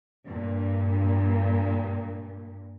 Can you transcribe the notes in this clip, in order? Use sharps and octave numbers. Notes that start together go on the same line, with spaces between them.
G2 A#2